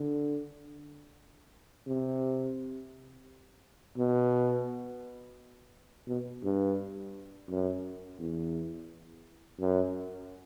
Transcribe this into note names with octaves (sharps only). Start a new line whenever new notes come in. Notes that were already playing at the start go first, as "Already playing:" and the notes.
Already playing: D3
C3
B2
B2
G2
F#2
E2
F#2